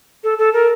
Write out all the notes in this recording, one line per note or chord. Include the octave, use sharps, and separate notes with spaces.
A4
A4
A#4